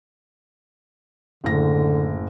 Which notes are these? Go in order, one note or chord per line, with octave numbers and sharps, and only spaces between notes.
F#1 A2 D3 A#6